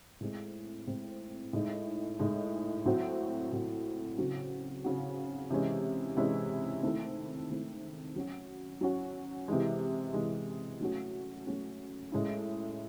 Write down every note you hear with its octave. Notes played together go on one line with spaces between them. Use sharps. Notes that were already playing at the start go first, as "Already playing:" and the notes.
A2 G#3 C4
A2 G#3 C4
A2 G#3 D#4
A2 G#3 D#4
A2 F#3 C4 F#4
A2 F#3 C4 F#4
C#3 F#3 C4 F#4
C#3 F#3 C4 F#4
C3 E3 G#3 C#4 E4
C3 E3 G#3 C#4 E4
D#3 A3 C4 E4
D#3 A3 C4 E4
F#3 C#4 F#4
F#3 C#4 F#4
C3 E3 G#3
C3 E3 G#3
F#3 A3 C#4 F#4
F#3 A3 C#4 F#4
A2 G#3 C#4 E4